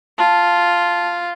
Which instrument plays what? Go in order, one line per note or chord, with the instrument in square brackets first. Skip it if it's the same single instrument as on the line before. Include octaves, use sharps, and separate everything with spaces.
[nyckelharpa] F4 [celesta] A5